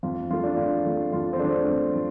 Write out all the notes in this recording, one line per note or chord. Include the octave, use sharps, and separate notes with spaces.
F2 F4
F3 A3 F4
D4
F2 F4
F3 A3
F2 F4
C4
F3 A3 D4
F2
F3